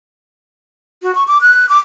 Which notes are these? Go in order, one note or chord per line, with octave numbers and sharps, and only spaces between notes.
F#4
C#6
D6
F#6
D6